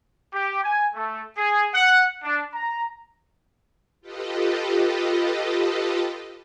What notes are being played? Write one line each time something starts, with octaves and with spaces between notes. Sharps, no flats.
G4
G#5
A3
G#4
F#5
D4
A#5
F4 G4 A4 B4 D#5